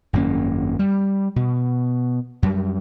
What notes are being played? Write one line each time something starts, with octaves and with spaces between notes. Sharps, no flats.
G#1 F#2 A#3 C#4
G3
B2
F#2 G3